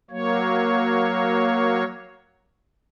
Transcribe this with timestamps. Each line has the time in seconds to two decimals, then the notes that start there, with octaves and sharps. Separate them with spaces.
0.11 F#3 A#3 C#5